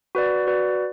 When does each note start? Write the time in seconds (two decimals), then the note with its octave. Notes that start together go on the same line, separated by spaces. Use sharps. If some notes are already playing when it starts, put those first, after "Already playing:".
0.15 F#4 B4 D5
0.47 F#4 B4 D5